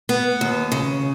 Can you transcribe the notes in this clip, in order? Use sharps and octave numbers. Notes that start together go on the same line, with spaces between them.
B3
D#2
C#3